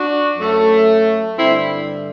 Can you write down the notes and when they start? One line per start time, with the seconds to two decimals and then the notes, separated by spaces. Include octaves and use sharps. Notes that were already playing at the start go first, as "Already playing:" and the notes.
Already playing: D4 F#4
0.37 F#2 F#3 A3
1.38 G2 D3 G3 C4 E4